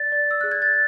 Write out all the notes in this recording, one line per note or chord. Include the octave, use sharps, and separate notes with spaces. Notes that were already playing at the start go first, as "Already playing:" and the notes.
Already playing: D5 A6
D5
E6
G#4 F#6
G#6
A6